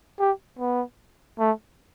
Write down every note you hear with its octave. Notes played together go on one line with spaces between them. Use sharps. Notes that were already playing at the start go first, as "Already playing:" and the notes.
G4
B3
A3